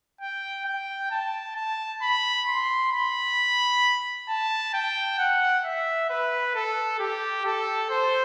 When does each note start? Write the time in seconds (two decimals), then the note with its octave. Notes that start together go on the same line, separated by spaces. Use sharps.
0.21 G5
0.66 G5
1.11 A5
1.56 A5
2.02 B5
2.48 C6
2.92 B5
4.29 A5
4.74 G5
5.19 F#5
5.65 E5
6.10 B4
6.55 A4
6.99 G4
7.45 A4
7.90 C5